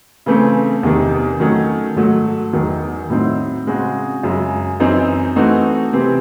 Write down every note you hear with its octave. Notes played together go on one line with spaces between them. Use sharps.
C#3 E3 A3 C4
E2 C3 D#3
D#3 F#3 A3 C#4
G#2 F#3 A3
E2 D#3 F#3
A2 F#3 C4 D#4
C#3 G#3 C4 F#4
F#2 C#3 G#3
F#2 E3 C4 D#4
E3 A3 C4 D#4 F#4
C3 E3 C4